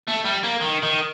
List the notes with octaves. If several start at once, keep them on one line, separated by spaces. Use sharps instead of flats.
A3
G3
A#3
D#3
D#3